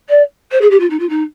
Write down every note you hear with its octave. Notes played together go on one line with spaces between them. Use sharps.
D5
C5
G#4
G4
F4
D#4
F4
D#4